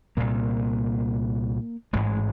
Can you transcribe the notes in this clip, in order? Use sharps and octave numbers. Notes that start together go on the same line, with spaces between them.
C2 A#2 A#3
A1 G#2 G#3